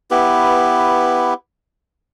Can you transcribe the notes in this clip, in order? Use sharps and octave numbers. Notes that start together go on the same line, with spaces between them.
B3 E4 G4 B4